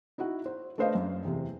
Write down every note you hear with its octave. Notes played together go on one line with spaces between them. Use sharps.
D#4 E4 F#4 F#5
C5
A3 D4 B4 C5 D#5 F5
F#2
E2 C3